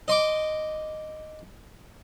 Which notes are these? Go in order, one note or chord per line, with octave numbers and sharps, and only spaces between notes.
D#5 C6 D6